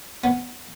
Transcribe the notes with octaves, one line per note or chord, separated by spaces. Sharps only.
B3